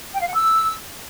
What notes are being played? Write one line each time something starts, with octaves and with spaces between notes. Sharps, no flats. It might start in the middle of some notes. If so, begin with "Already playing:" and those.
G5
F5
F#5
E6